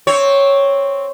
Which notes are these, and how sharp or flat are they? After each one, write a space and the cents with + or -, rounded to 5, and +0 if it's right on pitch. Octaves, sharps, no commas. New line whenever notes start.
C4 +0 C#5 +0